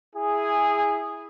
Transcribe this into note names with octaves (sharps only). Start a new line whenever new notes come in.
E4 G#4